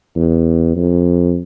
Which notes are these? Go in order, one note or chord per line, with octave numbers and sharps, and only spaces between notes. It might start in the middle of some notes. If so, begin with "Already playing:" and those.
E2
F2